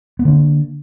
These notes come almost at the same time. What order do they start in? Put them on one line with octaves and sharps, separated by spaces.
B3 A#3 D3 D4